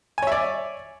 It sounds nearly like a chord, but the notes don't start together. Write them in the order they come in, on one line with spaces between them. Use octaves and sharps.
G#5 C#5 E5 D5